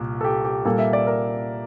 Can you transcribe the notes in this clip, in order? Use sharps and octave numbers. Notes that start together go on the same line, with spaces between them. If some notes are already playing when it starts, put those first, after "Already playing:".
Already playing: C2 A#2 F4
A4
G4
G4
A#2 G3 A#3 A4
E5
D5
A#4